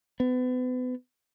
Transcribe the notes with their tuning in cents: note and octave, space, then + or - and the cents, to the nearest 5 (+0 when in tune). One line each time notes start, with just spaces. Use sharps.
B3 +35